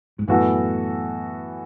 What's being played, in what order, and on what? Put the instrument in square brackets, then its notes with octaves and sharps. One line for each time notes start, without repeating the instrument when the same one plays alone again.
[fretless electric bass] G#2
[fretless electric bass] F#2 A2 [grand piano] E3 B3 F#4 A4